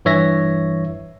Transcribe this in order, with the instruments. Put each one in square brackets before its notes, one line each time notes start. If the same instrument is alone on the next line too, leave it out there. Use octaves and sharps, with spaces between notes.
[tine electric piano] G2 E3 C#5 E5 A#6